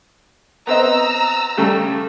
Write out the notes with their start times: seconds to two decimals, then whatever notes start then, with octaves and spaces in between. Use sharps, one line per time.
0.67 B3 C4 D#5 A#5 E6
1.57 C#3 G3 A3